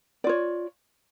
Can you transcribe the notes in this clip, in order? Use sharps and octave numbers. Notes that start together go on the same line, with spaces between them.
F4 C#5 D5